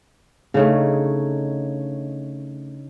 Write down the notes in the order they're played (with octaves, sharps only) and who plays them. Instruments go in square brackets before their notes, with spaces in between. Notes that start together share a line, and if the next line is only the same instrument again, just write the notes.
[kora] C#3 A3 [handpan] D4 D#4 C#5